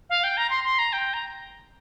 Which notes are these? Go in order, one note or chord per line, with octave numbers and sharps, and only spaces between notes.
F5
G5
A#5
C6
C6
A#5
G5
A#5